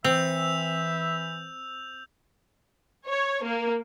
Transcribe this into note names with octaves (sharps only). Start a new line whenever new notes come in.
E3 C4 E5 E6 G6 F7
C#5
A#3